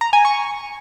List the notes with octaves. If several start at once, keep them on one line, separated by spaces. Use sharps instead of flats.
A#5
G#5
C#6